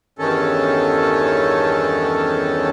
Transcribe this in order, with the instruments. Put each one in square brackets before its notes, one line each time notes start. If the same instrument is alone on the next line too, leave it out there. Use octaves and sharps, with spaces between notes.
[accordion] E2 G2 D#3 C#4 A4